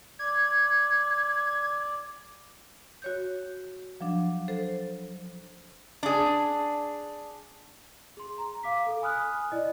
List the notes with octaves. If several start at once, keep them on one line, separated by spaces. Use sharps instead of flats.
D5 G#6
F#4 C#5 G6
F3 F#3 D4
A4 C5
D4 G#4
G#4 C6
A#5
F5 D6 B6
A4
G#5 B5 D#6 F6 F#6
E4 D5 D#5